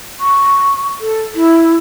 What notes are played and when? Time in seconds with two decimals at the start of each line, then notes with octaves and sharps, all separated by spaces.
0.20 C#6
1.01 A4
1.35 E4